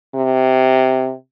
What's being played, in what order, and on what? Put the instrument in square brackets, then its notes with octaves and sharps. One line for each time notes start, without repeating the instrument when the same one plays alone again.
[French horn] C3